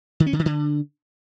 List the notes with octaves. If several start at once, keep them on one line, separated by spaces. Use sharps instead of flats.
D#3
C#4
D3
D#3
D3